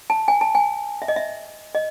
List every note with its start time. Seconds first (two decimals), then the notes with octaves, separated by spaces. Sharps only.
0.10 A5
0.28 G#5
0.41 A5
0.55 G#5
1.02 E5
1.08 D#5
1.16 E5
1.75 D#5